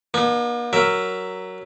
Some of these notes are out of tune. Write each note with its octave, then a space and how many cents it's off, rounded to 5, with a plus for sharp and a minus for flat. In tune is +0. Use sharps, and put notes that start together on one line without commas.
A#3 +45 D#4 -35
F#3 +10 A#4 +0 E5 +0